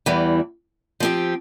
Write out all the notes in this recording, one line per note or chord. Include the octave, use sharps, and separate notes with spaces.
E2 E3 G3
F3 C4 G4